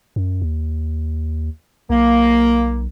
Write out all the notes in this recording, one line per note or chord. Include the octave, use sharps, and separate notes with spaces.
F#2
D#2
B1 A#3